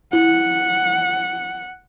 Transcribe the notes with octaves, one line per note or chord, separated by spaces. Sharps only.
E4 F#5